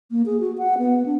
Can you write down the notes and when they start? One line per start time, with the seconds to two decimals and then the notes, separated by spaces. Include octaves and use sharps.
0.11 A#3
0.26 G#4
0.40 F#4
0.58 F#5
0.78 B3
1.06 D4